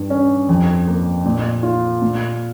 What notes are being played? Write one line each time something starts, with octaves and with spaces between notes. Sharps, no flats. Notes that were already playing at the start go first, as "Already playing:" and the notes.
Already playing: G2
C#4
F2
A#3
A#2
F4
A#2